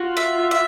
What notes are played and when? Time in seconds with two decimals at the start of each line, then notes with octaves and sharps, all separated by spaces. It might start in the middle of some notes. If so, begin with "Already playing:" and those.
Already playing: F4 F#4
0.17 E5
0.51 E5